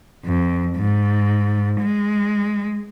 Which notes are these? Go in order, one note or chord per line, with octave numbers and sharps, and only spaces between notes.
F2
G#2
G#3